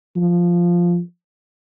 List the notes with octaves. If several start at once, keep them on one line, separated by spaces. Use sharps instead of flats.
F3